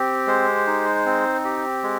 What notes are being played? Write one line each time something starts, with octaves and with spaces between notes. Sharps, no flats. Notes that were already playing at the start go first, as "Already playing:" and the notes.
Already playing: C4 G4
G#3 C5
D#4
C4
G4
G#3